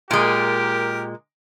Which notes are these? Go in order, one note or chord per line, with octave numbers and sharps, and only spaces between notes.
A#2 G#3 G4 A#4